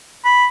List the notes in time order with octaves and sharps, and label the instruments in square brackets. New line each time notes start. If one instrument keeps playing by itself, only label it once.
[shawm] B5